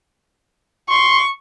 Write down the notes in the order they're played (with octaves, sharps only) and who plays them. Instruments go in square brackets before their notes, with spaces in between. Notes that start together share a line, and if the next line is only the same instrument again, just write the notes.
[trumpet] C6 [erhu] C#6